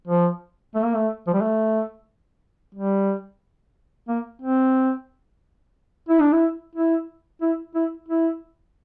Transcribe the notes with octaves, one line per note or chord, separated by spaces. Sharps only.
F3
A3
A#3
A3
F3
G3
A3
G3
A#3
C4
E4
D4
E4
E4
E4
E4
E4